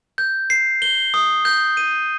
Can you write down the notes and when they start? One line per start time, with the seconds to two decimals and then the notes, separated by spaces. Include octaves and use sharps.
0.18 G6
0.50 C7
0.82 G7
1.14 D#6
1.45 G6
1.77 D#7